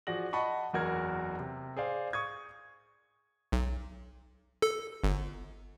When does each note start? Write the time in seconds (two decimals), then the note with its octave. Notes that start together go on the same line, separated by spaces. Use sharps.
0.07 F3 F#4 G#4 D5 A#6 F#7
0.33 D#5 F#5 A5 B5 C#6
0.73 F#1 E2 F#4 A#4 G#6
1.39 C3
1.77 G#4 C5 D5 F5
2.13 C#6 D#6 G#6
3.52 B1
4.62 A4
5.04 G1